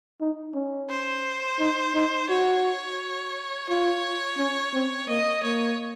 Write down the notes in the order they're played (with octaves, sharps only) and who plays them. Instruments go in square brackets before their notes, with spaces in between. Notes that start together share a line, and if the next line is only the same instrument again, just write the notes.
[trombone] D#4
C#4
[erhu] C5
[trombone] D#4
D#4
[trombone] F#4 [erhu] C#5
[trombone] F4 [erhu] C#5
[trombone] C#4
C4
[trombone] A#3 [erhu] D#5
[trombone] A#3 [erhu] C#5